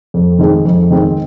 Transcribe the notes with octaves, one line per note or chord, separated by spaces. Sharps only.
F2
D#3 G#3 C4
F2
D#3 G#3 C4